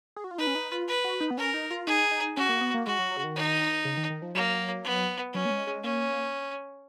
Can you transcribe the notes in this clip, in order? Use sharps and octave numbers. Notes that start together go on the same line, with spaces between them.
G#4
F#4
F4
D#4 B4
C#4
D#4
F4
B4
F#4
D#4
B3
C#4 A#4
D#4
F4
D#4 G#4
D#4
C#4 F#4
A#3
B3
A#3
G#3 F#4
F#3
F#3
C#3
D#3
D#4
C#3
D#3
D#3
F3
F#3 A#3
B3
F#3 C#4
A#3
G#3
G#3
A#3 C#4